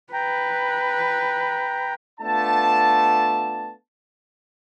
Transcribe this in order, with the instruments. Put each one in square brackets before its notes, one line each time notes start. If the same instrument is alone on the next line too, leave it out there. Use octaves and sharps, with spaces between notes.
[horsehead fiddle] B4 [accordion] G5 A#5
[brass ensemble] A3 B3 D4 F4 A5